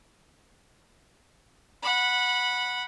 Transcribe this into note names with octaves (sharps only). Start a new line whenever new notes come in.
F#5 B5